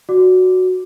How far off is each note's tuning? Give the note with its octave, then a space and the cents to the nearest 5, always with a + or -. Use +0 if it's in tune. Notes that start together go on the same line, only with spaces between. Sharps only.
F#4 -5 D5 +0 D6 +0